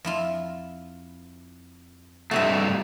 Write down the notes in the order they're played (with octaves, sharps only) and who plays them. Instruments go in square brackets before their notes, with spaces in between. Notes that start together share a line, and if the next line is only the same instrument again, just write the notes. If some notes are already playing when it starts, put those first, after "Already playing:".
[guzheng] F2 E4 F4
[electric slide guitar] G2 C3 A3 [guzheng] F#4 D#5 E5